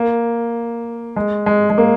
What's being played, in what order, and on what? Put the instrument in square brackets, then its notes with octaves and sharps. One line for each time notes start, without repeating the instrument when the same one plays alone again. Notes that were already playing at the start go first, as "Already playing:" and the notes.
Already playing: [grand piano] A#3
G#3
G#3
G#3
A#3